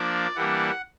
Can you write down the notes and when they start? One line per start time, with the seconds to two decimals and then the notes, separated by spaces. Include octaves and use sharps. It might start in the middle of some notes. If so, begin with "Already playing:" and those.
Already playing: F3 A#3 D4 D5
0.35 E3 G3 A#3 D4 F#5